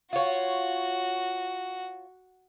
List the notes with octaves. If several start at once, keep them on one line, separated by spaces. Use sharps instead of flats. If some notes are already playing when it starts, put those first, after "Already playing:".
F4 F#4 C#5